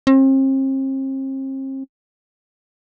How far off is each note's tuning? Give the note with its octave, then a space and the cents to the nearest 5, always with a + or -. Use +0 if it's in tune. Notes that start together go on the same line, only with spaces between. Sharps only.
C4 +40